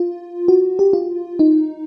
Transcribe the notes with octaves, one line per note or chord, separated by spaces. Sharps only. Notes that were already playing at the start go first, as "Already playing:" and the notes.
Already playing: F4
F#4
G4
F4
D#4